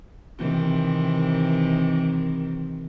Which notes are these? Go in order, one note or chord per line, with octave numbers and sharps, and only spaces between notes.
C3 D#3 E3